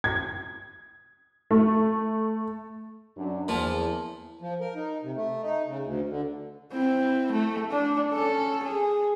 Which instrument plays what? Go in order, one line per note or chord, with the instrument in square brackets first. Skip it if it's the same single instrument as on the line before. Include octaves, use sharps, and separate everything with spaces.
[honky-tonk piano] G#6
A3
[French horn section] F#2 D4
[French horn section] E2 [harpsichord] A#2 F3
[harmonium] F3
A#4
D#4
C3
A3
D#4
C#3
D2
D3
[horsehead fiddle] C4 E4
A3
D4
C#4 A4
G#4